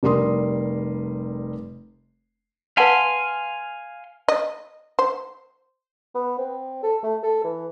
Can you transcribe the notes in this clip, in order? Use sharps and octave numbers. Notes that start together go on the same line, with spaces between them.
F1 G3 A#4 C6 D#6
B4 F5 F#5 G#5 A5 C6
D#5
C5
B3
C4
A4
A3
A4
E3